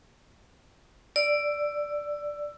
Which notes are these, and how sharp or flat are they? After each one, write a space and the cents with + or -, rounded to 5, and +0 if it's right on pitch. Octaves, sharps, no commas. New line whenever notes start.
D5 +0 E6 +15